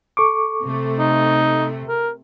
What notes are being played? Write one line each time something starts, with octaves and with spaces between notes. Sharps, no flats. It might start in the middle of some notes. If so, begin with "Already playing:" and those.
A4 C#6 D6
C3 A3
D#4
A#4